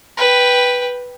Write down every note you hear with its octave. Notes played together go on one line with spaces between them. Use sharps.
B4 G5